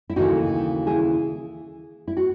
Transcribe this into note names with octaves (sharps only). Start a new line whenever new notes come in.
E4
D#2 C#3 E3 A3 D#4 F#4
E4 G#4
E4
F#4